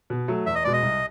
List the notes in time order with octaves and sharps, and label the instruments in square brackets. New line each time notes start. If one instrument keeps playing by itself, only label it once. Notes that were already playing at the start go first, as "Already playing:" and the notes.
[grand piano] B2
F#3 A3
[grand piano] E2 [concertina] E5
[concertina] D#5
[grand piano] B2 G#3 [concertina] D5
[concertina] D#5
[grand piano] C2